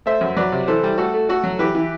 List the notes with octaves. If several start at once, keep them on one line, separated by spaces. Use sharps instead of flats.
A3 C5 E5
F#2
F#3 B4 D5
C3
E3 A4 C5
G3
A3 F#4 A4
A3
A3 F#4 A4
F#3
E3 G4 B4
E3